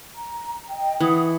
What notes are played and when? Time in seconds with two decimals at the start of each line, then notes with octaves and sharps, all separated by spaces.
0.15 A#5
0.69 D#5 G5
1.00 E3 F#5 D#6